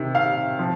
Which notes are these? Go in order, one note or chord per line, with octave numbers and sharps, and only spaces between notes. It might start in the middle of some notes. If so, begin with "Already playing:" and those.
Already playing: C3 D#3
F5
F3